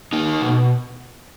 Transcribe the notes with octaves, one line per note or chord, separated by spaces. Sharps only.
A#3 D#4
B2